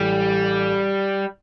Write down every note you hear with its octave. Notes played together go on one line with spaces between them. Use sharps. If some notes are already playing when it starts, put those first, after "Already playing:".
Already playing: A1 A2 E3 G3